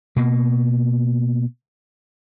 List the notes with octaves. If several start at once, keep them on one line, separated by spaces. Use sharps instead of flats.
B2 A#3